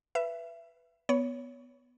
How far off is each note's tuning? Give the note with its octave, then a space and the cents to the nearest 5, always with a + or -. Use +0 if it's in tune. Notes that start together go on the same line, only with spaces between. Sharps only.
B4 +0 E5 +25
B3 +0 C#5 +20